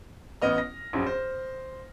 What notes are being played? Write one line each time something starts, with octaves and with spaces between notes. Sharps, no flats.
A1 B3 D#5 F6
A#6
A#1 F#2
C5